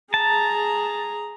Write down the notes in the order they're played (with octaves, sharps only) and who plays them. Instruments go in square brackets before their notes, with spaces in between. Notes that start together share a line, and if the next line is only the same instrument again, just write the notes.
[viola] G#4 A#5 [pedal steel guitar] A5